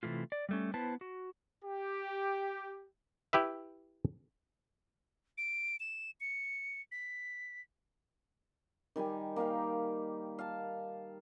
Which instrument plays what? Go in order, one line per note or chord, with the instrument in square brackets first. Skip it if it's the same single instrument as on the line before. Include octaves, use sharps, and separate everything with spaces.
[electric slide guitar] C3 D#3 E3 A3 F4
D5
G3 A3 C#4
B3 E4 B4 C5 A5
F#4
[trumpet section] G4
[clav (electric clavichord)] E4 G4 B4 E5
[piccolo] D7
E7
C#7
B6
[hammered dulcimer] D#3 G3 G4 G#5
A#3 D#4 G4 F5
F5 A5